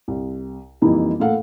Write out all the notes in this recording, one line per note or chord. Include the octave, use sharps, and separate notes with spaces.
C2
F2 E3 G3 A#3 D#4 E4
A2 A#3 A4 F5 F#5